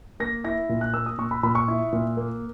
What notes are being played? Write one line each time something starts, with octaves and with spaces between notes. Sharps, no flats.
A#3 A#6
E4 A#6
A#2
F#6
A#3 E6
D#6
A#2 C#6
B5
A#2 B5
C#6
E4
A#2
A#3